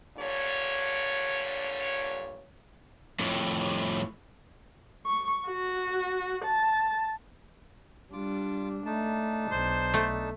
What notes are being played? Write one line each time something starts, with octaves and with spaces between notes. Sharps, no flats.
G2 A#2 D3 C#5
F2 A2
C#6
F#4
A5
G3 D4 F4 D6
A3 D4 D#4 A5
B1 C5
A3